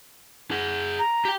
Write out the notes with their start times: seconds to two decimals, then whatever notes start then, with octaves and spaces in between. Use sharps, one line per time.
0.51 G#4 F#5
0.99 A#5
1.25 G4 G5